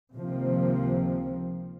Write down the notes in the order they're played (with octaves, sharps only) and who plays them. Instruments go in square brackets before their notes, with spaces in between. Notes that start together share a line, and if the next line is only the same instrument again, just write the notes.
[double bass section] C#2 C3 D#3 F3 A#3 C4